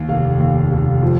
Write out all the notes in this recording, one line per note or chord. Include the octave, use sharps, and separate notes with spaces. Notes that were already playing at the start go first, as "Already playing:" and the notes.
Already playing: D#2
F1 F5
D#2
F1
F3